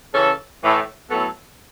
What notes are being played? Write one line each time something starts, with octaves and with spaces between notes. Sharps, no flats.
C#3 E3 C#4 A4
A2 E3 A3
A2 F#3 B3 A4